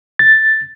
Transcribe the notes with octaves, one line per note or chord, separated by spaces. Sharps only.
A6